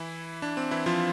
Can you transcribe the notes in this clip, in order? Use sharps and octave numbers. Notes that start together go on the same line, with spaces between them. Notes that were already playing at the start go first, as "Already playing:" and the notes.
Already playing: E3 E4
D4
C4
E3 E4
F3 F4